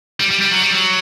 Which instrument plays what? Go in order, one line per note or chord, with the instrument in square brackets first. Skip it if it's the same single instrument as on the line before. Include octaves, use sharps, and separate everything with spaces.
[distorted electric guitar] G3
G3
G3
F#3
G3
F#3